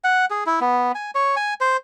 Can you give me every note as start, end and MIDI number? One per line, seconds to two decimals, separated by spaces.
0.04 0.25 78
0.30 0.44 68
0.46 0.59 64
0.61 0.92 59
0.95 1.11 80
1.15 1.35 73
1.36 1.54 80
1.61 1.77 72